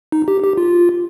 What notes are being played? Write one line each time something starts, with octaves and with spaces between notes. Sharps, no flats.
D#4
G4
G4
F4